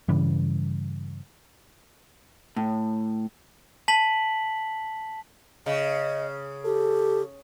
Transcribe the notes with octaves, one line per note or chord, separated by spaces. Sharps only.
G2 C#3 E3 G3
A2
A5 B6 F#7
C#3 D#5
G4 A4